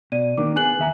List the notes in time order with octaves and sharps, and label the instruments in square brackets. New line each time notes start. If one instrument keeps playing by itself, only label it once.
[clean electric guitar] B2 [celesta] D5 D#7
[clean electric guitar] D#3 A#3 D4 [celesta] D6
[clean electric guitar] B3 G#4 [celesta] G#5 F#6 F#7
[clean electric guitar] D#2 E5 A#5